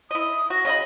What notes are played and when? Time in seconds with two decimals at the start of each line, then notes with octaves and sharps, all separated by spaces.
0.11 E4 D#5 D#6
0.50 F#4 A#6
0.65 C#3 D#5 B5